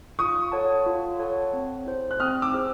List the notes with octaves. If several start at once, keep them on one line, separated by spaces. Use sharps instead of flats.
F4 C#6 D#6
A4 C#5 F#5 A5
F4
A4 C#5 F#5 A5
C4
E4 G#4 C5
F#6
C4 D#6 F6
D6 E6
E4 G#4 C5